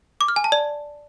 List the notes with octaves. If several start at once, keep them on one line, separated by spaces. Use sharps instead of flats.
D6
F6
G#5
A5
D5